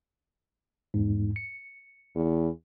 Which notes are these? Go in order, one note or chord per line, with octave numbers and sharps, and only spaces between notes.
E2 G#2
C#7
E2